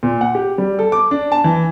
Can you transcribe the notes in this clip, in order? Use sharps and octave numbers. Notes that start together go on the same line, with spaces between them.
A#2
F#5
G4
G3
A4
D6
D4
A5
E3